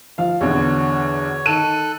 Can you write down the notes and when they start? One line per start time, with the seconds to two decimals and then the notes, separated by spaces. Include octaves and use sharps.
0.18 F3 F5
0.41 E2 B2 D3 C#5
1.46 D#3 A4 F#6 D#7